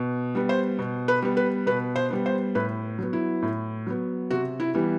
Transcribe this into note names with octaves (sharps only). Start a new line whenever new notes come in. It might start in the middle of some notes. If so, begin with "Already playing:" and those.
Already playing: B2
G3 B3
C5
B2
B4
G3 B3
B4
B2 B4
C5
G3 B3
C5
A2 B4
F#3 B3
E4
A2
F#3 B3
C3 F#4
E4
E3 G3 B3